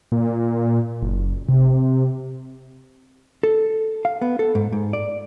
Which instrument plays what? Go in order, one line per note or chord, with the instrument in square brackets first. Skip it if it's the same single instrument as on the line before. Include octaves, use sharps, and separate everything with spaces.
[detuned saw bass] A#2
F#1
C3
[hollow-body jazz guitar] A4
F5
B3
A4
G#2
G#2
D5